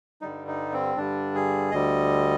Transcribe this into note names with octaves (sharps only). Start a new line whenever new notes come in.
G2 D3 G3 D#4
D#4
C4
G2 D3 G3 D4
G#4
D2 D3 G3 D#5